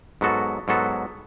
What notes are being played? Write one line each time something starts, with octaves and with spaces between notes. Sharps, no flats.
G#2 F#3 B3 F#4 A4
G#2 F#3 B3 F#4 A4